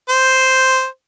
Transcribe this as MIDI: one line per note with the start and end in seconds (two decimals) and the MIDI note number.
0.09 0.87 72